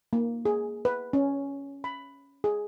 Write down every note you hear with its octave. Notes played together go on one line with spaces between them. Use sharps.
A#3
G#4
B4
C#4
B5
G#4